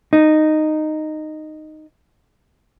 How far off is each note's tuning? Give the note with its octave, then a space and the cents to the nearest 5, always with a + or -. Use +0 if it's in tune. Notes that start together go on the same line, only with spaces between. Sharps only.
D#4 -10